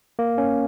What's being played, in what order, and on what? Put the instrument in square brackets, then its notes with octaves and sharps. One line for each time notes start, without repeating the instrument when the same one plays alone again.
[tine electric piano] A#3
C#4